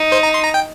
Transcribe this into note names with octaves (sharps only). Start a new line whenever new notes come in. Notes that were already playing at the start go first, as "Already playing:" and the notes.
Already playing: D#4
C5
A#5
C6
A#5
G5